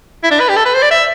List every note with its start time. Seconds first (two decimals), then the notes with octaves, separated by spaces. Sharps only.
0.23 E4
0.31 D4
0.40 B4
0.49 G4
0.57 A4
0.66 B4
0.74 C5
0.82 D5
0.91 E5